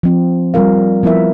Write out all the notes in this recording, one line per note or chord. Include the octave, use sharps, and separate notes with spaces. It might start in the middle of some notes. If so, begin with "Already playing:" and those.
F3 C4
G3 C4 F4 A#4 F5
F3 B3 E4 A#4 E5